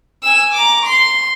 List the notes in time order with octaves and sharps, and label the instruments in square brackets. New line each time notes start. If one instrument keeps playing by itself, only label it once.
[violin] G#5 E6
A#5 D6
C6